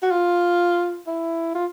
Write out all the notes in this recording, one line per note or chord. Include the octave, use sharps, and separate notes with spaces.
F#4
F4
E4
F4